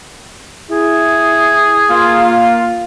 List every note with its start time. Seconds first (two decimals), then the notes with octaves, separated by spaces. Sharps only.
0.71 E4 G#4
1.91 A#3 F4